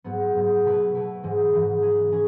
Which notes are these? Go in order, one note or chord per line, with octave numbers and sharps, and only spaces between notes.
G#2 F#3 B3
G#2 F#3 B3
B2 A3 E4 B4
B2 A3 E4 B4
G#2 E3 G#3
G#2 E3 G#3
E3 G#3 C#4 G#4
E3 G#3 C#4 G#4